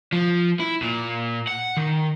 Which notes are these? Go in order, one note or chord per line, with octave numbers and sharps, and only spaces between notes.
F3
E4
A#2
F#5
D#3